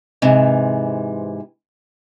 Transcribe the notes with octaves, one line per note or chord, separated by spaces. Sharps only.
G#2 C3 E3